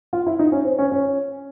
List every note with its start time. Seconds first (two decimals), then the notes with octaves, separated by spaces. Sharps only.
0.13 F4
0.27 E4
0.39 D#4
0.52 C#4
0.64 C4
0.79 C#4
0.92 C#4